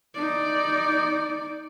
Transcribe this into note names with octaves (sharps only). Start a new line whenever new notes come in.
D#4 D5